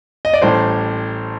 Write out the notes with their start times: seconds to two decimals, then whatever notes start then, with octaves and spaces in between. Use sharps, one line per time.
0.25 D#5
0.34 D5
0.42 A1 A2 G3 C5